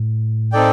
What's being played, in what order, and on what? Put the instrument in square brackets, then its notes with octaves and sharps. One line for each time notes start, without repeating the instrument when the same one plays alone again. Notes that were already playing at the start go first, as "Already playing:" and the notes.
Already playing: [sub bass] A2
[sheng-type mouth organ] C4 D#4 A4 D5 G5